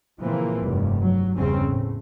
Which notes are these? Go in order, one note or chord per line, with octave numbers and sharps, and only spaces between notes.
A#2 C#3 E3 F3 A#3 C4
F1 G2
F#3
F#1 E2 G2 C#3 C4 C#4
A2